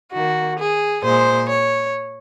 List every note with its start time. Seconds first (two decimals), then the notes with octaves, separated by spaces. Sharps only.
0.13 D#3 A#3 F#4
0.59 G#4
1.03 A#2 G#3 C5
1.49 C#5